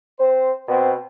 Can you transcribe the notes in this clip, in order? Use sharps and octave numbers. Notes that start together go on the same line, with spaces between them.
C4 C5
B2 B3 C4